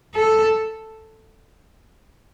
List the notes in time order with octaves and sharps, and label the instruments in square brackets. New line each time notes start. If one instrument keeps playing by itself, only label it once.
[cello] A4